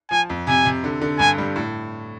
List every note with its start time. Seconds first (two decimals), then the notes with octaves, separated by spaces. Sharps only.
0.11 F3 G#5
0.30 F2
0.47 C3 G#5
0.65 C3
0.84 D3
1.02 D3
1.19 G2 G#5
1.38 G3
1.56 A2